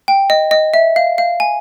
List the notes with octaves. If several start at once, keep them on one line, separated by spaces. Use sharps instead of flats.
G5
D#5
D#5
E5
F5
F5
G#5